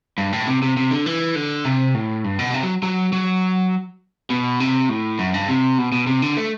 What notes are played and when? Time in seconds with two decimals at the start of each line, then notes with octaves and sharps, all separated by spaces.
0.18 G2
0.32 A2
0.47 C3
0.62 C3
0.77 C3
0.91 D3
1.06 E3
1.35 D3
1.65 C3
1.94 A2
2.24 G2
2.39 B2
2.54 C3
2.63 F#3
2.83 F#3
3.13 F#3
4.30 B2
4.60 C3
4.89 A2
5.19 F#2
5.34 G2
5.48 C3
5.78 B2
5.92 B2
6.07 C3
6.22 D3
6.37 A3